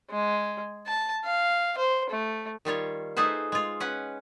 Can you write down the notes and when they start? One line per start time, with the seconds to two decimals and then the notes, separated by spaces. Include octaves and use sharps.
0.10 G#3
0.87 A5
1.25 F5
1.78 C5
2.10 A3
2.65 D#3 G3 F4 C#5
3.17 A3 D#4 G#4 B4 C5
3.52 G#3 F4
3.80 C#4 B4 F#5